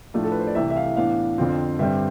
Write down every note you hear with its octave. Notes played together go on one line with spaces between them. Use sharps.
A2 F3 A3 D4
A4
B4
C5
D5
C2 C3 E3 A3 E5
E5
F5
A2 E3 B3 D4 F5
F2 D3 F3 C4
G2 D3 G3 C4 E5